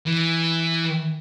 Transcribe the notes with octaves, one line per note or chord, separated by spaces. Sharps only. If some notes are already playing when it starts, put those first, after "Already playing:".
E3